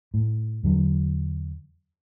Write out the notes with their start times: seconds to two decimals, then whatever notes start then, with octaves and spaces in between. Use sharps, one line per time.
0.14 A2
0.63 E2 D3 F#3